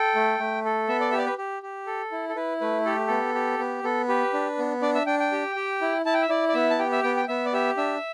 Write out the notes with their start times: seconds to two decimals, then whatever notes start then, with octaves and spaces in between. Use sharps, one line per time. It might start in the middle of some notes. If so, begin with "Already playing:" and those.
Already playing: A4 G5
0.15 A3
0.39 A3
0.65 A4
0.88 B3 E5
1.00 D5
1.11 G4 E5
1.18 D5
1.26 B4
1.38 G4
1.63 G4
1.87 A4
2.12 E4
2.29 A4
2.36 E4 B4
2.61 A3 B4
2.85 G4 A4
3.08 B3 A4
3.35 G4
3.59 B3
3.83 B3 A4
4.08 G4 B4
4.33 D4
4.58 B3
4.82 D4 D5
4.95 E5
5.06 D4 G5
5.20 G5
5.32 G4
5.56 G4
5.81 E4
6.06 E4 A5
6.14 G5
6.22 E5
6.29 E4 D5
6.49 D5
6.54 B3 E5
6.70 A5
6.79 G4 G5
6.92 E5
7.03 B3 G5
7.17 G5
7.28 B3 E5
7.45 D5
7.53 G4 E5
7.77 D4 E5